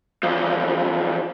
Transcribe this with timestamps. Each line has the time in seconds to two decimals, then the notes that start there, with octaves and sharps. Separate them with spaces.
0.23 E2 F3